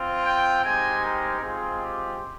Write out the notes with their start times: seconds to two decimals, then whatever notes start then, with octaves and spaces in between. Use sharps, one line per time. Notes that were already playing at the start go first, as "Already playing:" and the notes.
Already playing: C4 F4
0.22 G5
0.62 G#3 C4 D#4 G4 G#5
1.01 A#4
1.40 G#3 C4 F4 G#4
1.81 G4